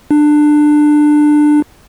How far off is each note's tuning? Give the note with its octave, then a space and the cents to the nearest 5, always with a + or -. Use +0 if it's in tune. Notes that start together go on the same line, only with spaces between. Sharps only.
D4 +20